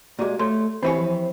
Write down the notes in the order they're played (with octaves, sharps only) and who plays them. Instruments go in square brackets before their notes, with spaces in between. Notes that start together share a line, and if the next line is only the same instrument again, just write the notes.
[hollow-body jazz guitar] A#2 G#3 [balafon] F#4 G4
[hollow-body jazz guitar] A3 [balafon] C#5 C6
[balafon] E3 G4 G#5 [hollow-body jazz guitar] C4 E4 C#5
[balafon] F3